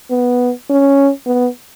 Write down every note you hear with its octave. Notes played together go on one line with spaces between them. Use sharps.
B3
C#4
B3